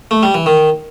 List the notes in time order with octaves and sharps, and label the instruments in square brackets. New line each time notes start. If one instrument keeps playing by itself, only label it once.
[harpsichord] A3
G3
E3
D#3